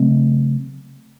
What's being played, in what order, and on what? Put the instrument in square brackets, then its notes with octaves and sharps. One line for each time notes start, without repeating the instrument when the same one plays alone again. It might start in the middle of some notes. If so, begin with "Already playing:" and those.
Already playing: [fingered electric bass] C#3 F#3 A3 C4